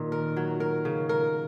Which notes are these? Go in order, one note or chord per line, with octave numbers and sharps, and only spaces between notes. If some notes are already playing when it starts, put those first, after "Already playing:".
Already playing: A#2 D#3 D#4
A#4
F#3
A#4
C#3
A#4